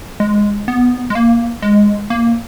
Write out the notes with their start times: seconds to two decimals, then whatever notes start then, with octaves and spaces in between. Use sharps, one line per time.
0.20 G#3
0.68 B3
1.10 G#3
1.15 A#3
1.62 G#3
2.10 A#3